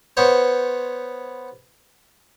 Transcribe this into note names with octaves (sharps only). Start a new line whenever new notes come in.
B3 C5 C#5